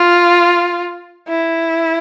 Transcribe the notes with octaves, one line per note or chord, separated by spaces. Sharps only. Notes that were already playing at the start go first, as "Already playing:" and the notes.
Already playing: F4
E4